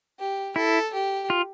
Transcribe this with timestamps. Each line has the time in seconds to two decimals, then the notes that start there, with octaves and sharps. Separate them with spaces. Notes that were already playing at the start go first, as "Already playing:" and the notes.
0.19 G4
0.56 E4 A4
0.93 G4
1.30 F4